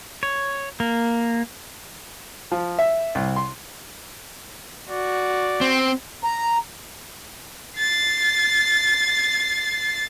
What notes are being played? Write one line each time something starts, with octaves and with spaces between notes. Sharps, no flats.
C#5
A#3
F3
E5
C2
C6
F#4 D5
C4
A#5
A6 C7